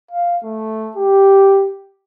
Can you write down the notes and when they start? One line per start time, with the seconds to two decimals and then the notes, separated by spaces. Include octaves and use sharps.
0.11 F5
0.43 A3
0.97 G4